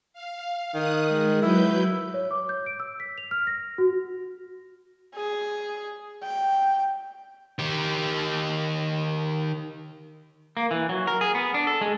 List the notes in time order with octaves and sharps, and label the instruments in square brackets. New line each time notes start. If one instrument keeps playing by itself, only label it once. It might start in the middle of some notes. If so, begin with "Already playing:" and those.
[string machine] F5
[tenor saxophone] D#3 [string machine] D#6 F#6
[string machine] G#3
[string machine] F#3 B4 G6 [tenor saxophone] E4
[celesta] C#5
D6
G6
D7
E6
B6
F7
F6
A#6
F#4
[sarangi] G#4
G5
[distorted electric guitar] D#3 G4
[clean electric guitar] A#3
E3
F#3
A#4
G#4
B3
D4
A4
G#3